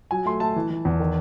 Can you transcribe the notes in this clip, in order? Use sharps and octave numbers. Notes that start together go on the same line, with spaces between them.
F#3 G#5
A3 C6
A3 A5
E3
E3
E2
D#3